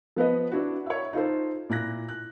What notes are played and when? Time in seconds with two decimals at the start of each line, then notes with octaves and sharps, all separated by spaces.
0.16 F3 B3 B4 D#5
0.51 D4 E4 F#4
0.86 C#5 E5
1.13 D#4 F4 A4 C5
1.69 A#2 E4 F#6 A#6
2.08 F#6